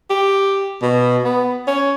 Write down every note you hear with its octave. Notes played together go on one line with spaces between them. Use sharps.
G4
B2
B3
C#4